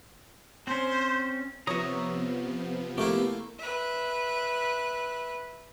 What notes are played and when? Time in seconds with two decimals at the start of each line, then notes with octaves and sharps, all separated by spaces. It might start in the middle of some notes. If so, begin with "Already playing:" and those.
0.67 C4 C#4 C5
1.67 C3 F3 B3 C#5 E5 A#5 D#6
2.98 A3 A#3 E4 G4
3.59 B4 E5